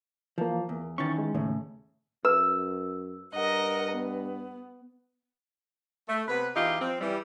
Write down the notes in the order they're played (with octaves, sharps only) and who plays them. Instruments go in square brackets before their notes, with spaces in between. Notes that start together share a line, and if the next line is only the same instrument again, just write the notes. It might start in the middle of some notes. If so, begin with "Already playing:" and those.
[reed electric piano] E3 A#3 [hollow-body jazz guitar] F3
[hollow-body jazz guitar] E2
[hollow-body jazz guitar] D#3 E3 C#4 [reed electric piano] C#6 A6
[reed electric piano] G#3
[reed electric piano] D#2 [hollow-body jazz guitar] A2 C#3
[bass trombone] F#2 [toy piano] B4 [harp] E6
[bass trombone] G2 [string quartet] A#4 D#5 F#5
[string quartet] B3
[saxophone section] A3
C3 B3 B4
E2 E3 D#4 F4 G4
F3 C4
E3 G3